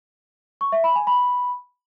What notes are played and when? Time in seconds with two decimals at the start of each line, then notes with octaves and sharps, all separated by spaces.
0.61 C#6
0.72 E5
0.84 B5
0.95 G#5
1.07 B5